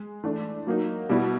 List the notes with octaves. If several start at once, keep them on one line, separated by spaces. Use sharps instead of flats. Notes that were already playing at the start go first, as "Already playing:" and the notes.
Already playing: G#3
E3 A3 D4
F#3 A#3 D#4
B2 G3 B3 E4